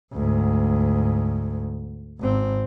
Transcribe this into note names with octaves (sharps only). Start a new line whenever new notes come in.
D2 G#2
G#1 C4